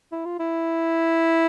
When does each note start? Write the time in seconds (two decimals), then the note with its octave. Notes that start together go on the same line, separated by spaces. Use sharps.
0.12 E4
0.25 F4
0.40 E4